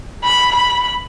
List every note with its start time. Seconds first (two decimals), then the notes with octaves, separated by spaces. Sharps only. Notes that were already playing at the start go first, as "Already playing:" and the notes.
0.24 B5
0.56 B5